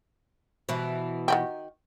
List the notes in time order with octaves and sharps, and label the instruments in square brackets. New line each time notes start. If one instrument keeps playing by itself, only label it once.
[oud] B2 E3
[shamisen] D#3 F#4 G4